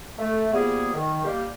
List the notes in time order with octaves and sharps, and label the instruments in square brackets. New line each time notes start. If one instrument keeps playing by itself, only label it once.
[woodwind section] A3
F3 G3 A#3 B3 G#4
D#3
G3 A#3 G4 F5